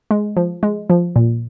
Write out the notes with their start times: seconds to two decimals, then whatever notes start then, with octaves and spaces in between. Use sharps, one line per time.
0.11 G#3
0.36 F3
0.63 G#3
0.90 F3
1.16 A#2